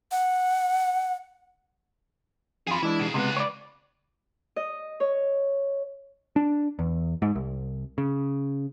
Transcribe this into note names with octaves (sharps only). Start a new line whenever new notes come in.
F#5
F2 F4 G#4 B5
E3 G#3 D4 E4
B2 G#4
C#2 C3 G#3 B3 B4
C#5 D5
D#5
C#5
D4
E2
G#2
C2
C#3